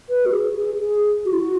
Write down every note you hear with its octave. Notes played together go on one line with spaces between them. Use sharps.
B4
F#4
G#4
G#4
G#4
F#4
E4
F#4